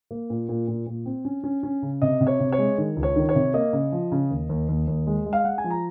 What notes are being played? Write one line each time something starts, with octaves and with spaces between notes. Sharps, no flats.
A#3
A#2
A#2
A#2
A#2
C4
C#4
C#4
C#4
C#3
C3 D#5
C3
C#5
C3
C#5
G#3
D#3
C#2
C#5
D#3
C#5
C3
A#3 D#5
C#3
F3
C#3
D#2
D#2
D#2
D#2
G#3
G#3
F5
G#3 F#5
G#5
F3
A#5